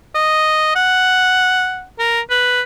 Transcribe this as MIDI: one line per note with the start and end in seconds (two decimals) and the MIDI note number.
0.15 0.74 75
0.76 1.84 78
1.99 2.21 70
2.30 2.62 71